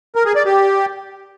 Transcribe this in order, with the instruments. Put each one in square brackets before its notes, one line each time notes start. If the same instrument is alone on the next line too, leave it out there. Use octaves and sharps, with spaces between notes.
[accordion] A#4
G#4
D5
G4